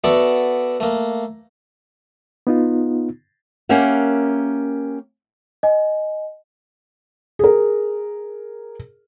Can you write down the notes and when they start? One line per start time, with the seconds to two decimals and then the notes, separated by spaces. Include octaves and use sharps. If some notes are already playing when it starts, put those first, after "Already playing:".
0.04 B3 F#4 A4 D5 E5
0.80 A3 A#3
2.47 B3 D#4 F4
3.69 A#3 C#4 G4 A#4 E5 F#5
5.63 D#5 G#5
7.39 G#4 A#4